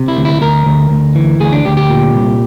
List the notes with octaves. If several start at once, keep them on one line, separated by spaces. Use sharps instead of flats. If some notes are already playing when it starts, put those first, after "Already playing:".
Already playing: C3
E4
D2
E4
D2 A#4
D2
D2
E3
D2 G#4
D4
D2 G4
G4
A#2
C2